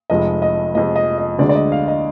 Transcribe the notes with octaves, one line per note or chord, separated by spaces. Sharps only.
F1 F2 F3 G#3 D#5
D#5
F1 F2 F3 G#3 D#5
D#5
D#5
D2 D3 G#3 D5
D5
D#5
F5
D#5